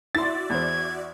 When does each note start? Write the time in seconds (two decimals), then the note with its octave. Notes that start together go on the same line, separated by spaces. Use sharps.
0.15 E4 F#4 D5 E5 C6 A6
0.50 E2 C5 G#6